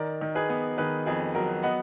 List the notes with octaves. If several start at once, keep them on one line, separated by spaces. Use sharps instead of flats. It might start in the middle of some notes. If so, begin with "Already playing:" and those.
Already playing: D#3 A#4 D5
D#3
G#4 B4
B3
D#3 G#4 B4
F2 G#4
F#3 F#4 A#4
B3 D#5 F#5